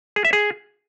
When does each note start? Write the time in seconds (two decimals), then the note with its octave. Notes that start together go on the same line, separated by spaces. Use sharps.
0.16 G#4
0.25 E5
0.33 G#4